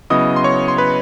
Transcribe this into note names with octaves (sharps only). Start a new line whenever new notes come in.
C#3 F#3 B3 E4 D#5 D#6
C6
C#5 C#6
C6
B4 B5